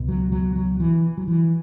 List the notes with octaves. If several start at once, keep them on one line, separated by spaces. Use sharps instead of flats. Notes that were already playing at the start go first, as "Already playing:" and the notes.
Already playing: C#2 B2
F#3
F#3
F#3
E3
F#3
E3